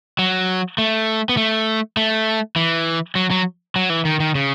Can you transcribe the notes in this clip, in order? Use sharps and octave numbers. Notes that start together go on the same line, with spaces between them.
F#3
A3
B3
A3
A3
E3
F#3
F#3
F#3
E3
D#3
D#3
C#3